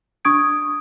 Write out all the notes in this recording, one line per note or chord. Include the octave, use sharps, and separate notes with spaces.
D4 C#6 D#6 G#6 D7